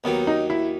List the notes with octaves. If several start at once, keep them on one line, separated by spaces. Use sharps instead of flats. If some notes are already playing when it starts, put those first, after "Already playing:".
D#2 D#3 F#3 B3
D#4
E4